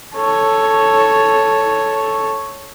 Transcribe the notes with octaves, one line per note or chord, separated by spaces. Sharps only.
A4 C#5